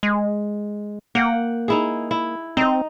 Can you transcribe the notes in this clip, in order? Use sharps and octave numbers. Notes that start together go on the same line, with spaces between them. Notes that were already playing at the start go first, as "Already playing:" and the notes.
G#3
A#3 F#5 G5
D#4 E4 G#4
E4
C4 D#4 D#5